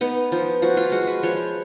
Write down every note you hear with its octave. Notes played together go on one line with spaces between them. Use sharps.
B3 D#4
F3
F3 F#4
F4
G#3 F#4
B4
F3 C#5